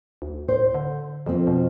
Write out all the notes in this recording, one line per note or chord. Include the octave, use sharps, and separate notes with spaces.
D2
A2 C5
D3
F2 F3 C4
B2